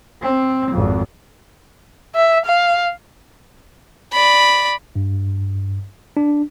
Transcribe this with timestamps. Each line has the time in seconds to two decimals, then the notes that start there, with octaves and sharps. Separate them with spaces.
0.22 C4
0.71 G#1 F2
2.15 E5
2.45 F5
4.12 D5 B5
4.96 G2
6.17 D4